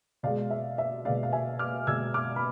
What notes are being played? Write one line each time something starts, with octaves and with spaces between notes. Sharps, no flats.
B2 G#3 D5 F5
E5
E5
B2 G#3 D5 F5
F5
E5 G#5
D6 F6
B2 G#3 E6 G#6
D6 F6
B5